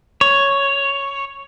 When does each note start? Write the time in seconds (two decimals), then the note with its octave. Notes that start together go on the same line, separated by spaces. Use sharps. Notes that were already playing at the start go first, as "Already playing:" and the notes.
0.21 C#5